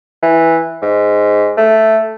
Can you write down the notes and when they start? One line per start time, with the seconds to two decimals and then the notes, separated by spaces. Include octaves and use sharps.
0.23 E3
0.82 G#2
1.57 A3